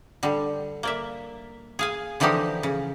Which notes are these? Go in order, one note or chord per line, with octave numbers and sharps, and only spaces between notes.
D3 G3
A#3 D5 E5
G#4 F5 G#5
D3 E3 F3 D#4 G4
C#3